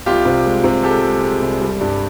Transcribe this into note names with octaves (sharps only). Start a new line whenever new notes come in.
C2 F4 G4
C3
G#3
C3
G#3 G4 A4
G#3
G#3
C2
G3
G2